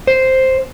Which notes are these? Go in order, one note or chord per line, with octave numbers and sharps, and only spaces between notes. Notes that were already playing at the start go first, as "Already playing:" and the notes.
C5